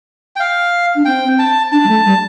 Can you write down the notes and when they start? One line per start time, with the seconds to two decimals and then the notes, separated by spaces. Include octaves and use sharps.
0.36 G5
0.40 F5
0.95 D4
1.05 C4 G5
1.39 A5
1.72 D4 A5
1.84 G3
1.89 A3
2.05 G3